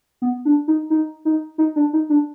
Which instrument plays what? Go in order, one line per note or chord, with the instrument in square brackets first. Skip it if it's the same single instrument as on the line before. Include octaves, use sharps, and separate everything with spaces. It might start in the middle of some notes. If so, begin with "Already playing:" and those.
[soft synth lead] B3
D4
D#4
D#4
D#4
D#4
D4
D#4
D4